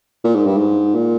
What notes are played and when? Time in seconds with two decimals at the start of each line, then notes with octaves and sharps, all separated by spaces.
0.24 A#2
0.35 G#2
0.46 G2
0.57 G#2
0.94 A#2